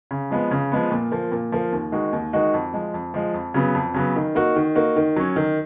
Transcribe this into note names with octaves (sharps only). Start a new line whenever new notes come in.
C#3
F3 G#3 B3
C#3
F3 G#3 B3
A#2
F3 A#3
A#2
F3 A#3
D#2
D#3 G#3 D#4 F#4
D#2
D#3 G#3 D#4 F#4
F2
F3 G#3
F2
F3 G#3
F2
C#3 F#3 B3
F2
C#3 F#3 B3
D#3
A#3 D#4 F#4
D#3
A#3 D#4 F#4
D#3
F#3 C#4
D#3